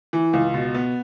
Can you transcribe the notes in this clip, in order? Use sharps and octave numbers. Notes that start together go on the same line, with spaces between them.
E3
C#2
B2
B3